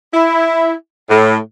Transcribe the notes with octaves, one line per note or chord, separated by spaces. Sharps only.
E4
A2